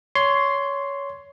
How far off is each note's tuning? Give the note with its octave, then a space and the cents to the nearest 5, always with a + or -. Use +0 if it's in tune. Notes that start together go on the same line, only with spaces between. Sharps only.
C#5 +15 C6 +0